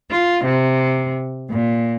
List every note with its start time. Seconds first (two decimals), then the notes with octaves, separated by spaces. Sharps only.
0.10 F4
0.44 C3
1.49 A#2